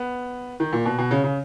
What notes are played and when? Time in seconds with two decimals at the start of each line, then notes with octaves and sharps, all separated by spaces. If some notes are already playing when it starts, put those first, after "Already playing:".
Already playing: B3
0.60 D#3
0.73 A#2
0.85 B2
0.98 B2
1.11 C#3
1.24 C#3